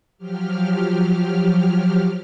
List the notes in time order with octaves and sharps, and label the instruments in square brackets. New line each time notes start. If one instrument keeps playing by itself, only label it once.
[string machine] F3 F#3 G4 F6